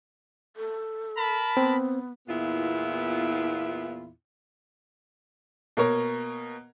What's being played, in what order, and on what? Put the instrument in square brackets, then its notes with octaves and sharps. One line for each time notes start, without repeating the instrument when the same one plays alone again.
[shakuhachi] A4
[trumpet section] A#4 A5 B5
[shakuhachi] B3 [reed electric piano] C4
[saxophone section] E2 A#2 B3 E4 F4
[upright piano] B2 A#3 A#4 C#5 A#5